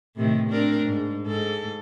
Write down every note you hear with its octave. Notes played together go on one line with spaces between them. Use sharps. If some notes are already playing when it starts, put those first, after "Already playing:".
A2 C3 D#3
C4 D4 A#4
G#2
G#2 A4